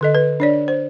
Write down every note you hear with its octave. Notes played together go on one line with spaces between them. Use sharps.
D3 A4 D#5
B4
D4 C#5 D5
C5